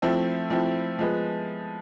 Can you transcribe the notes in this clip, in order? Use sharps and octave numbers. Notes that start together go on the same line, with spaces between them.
F3 A3 C4 E4
F3 A3 C4 E4
F3 G#3 B3